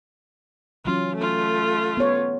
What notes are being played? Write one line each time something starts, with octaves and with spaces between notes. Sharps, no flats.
E3 F#3 C#4 F4
A3 F4
B3 C#5